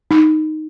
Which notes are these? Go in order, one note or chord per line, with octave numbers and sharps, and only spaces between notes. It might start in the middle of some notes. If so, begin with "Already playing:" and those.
D#4